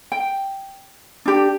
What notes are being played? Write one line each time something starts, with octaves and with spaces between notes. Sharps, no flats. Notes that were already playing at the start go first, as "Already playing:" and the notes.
G5
D4 G4